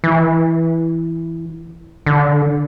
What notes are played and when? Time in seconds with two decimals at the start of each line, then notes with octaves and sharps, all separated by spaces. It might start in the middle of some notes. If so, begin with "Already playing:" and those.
0.04 E3
2.06 D3